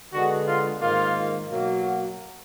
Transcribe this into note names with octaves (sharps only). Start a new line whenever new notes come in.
D3 G#3 B3 F#4
F4
G#2 D#3 A#3 F4
B2 F#3 A#3
F#4